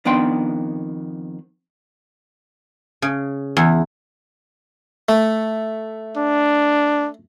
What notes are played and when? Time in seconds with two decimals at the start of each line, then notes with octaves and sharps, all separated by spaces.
0.05 F2 D#3 B3 D4 G5 C6
3.02 C#3
3.57 E2
5.09 A3
6.17 D4